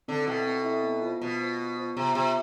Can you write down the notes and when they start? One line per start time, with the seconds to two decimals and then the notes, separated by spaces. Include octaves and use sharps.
0.08 D3 C4
0.27 B2 E4 A4 E5 G5
0.47 C4
0.65 E4 A4 E5 G5
0.84 B3
1.02 F4 C5
1.21 B2 B3
1.40 F4 C5
1.58 B3
1.77 F4 C5
1.96 C3 B3
2.15 C3 F4 C5